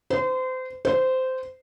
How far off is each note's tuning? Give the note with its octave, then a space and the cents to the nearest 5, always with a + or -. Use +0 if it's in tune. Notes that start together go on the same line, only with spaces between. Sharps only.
C5 -30
C5 -15